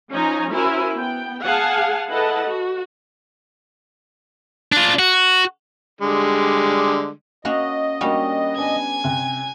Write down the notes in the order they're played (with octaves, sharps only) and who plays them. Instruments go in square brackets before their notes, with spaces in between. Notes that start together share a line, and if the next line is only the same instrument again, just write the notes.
[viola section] F3 C#4 D#4 D#5 G#5 A#5
C#4 E4 F#4 A#4 C5 G#5
B3 G5
G#4 F5 F#5 G#5 A5
E4 A4 B4 D#5 F#5 A5
F#4
[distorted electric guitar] D4 F4
F#4
[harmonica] D3 G3 G#3
[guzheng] A#3 C#4 F#4 [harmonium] D#5
[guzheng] G3 C#4 [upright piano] A#3 D4 F#4
[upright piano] B3 D4 [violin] G#5 G#6
[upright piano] C3 G5 F#6